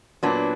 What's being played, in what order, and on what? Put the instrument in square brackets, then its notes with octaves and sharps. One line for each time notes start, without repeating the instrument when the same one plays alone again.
[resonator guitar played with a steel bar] A#2 F#3 B3 D4